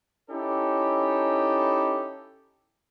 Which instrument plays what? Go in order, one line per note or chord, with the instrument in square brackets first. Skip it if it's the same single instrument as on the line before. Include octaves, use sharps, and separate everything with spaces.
[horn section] C#4 D#4 E4 G4 A4